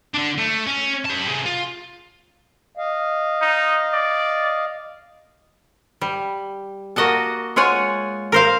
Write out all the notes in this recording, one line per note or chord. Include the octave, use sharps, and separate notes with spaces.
D3 D4
A3
C#4
G4 A5
C3 G#4
F4
D#5 F5
D#4
D5
G3
A#3 F#4 D#5 F#5 A5
G#3 F4 C#5 F#5 G#5
A#4 C5 F5